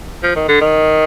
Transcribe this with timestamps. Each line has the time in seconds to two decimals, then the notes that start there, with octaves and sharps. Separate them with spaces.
0.23 F3
0.36 D#3
0.48 D3
0.61 D#3